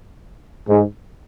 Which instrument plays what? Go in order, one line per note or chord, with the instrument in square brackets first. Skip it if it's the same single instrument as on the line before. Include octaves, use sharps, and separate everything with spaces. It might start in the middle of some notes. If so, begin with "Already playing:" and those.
[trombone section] G#2